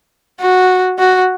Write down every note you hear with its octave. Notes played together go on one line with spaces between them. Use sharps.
F#4
F#4